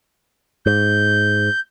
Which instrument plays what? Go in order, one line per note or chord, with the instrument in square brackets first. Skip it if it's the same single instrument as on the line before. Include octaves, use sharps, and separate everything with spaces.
[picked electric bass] G#2 [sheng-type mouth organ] G6